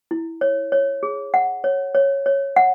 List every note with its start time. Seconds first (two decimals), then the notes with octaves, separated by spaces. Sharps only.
0.11 E4
0.41 C#5
0.72 C#5
1.03 G#4
1.34 F#5
1.64 C#5
1.95 C#5
2.26 C#5
2.56 F#5